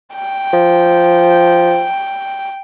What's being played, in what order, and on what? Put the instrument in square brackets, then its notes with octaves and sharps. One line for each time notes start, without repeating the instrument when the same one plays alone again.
[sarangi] G5
[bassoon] F3